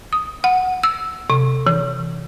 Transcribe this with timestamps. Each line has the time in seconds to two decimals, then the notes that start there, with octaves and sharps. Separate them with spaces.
0.13 D#6
0.44 F#5
0.84 E6
1.30 C3
1.67 E3